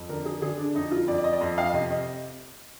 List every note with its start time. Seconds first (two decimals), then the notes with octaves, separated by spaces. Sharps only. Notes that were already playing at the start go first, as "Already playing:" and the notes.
Already playing: F2
0.09 D3 A#4
0.26 G#4
0.42 D3 G#4
0.59 D4
0.75 F2 D#4
0.91 F4
1.08 F2 D5
1.18 D5
1.24 D#5
1.33 D5
1.41 F2 D#5
1.58 F5
1.73 C3 D#5
1.91 D#5